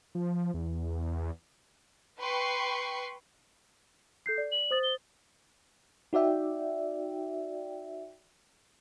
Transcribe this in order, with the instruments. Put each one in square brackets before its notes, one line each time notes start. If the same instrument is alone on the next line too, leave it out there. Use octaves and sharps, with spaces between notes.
[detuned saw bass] F3
E2
[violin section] B4 G5 C6 C#6 C7
[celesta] A4 G6 C7
D5
[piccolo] F#7
[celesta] C5 D#6 A6
[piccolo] G7
[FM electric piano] D#4 F#4 D5 E5 G5